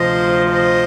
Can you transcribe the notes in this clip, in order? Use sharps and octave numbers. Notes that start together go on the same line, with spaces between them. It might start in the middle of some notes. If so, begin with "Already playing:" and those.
Already playing: D2 C3 F3 C5 D#5
C5 D#5